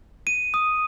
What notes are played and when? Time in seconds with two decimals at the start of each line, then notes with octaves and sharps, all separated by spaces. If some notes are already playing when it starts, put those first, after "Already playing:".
0.27 D#7
0.54 D#6